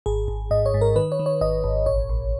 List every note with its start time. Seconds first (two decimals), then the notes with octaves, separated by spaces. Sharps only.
0.06 G#1 G#4
0.28 G#1
0.51 G#2 D#5
0.66 C#5
0.74 G#2
0.81 A#4
0.96 D#3 B4
1.12 C#5
1.19 D#3
1.26 C#5
1.41 G#1 D#5
1.64 G#1
1.86 A#1 C#5
2.09 A#1